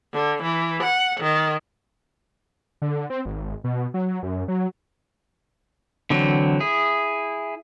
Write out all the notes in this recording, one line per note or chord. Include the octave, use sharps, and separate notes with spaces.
D3
E3
F#5
D#3
D3
C4
G#1
B2
F#3
F#2
F#3
D3 E3 F#3 C4
E4 G#4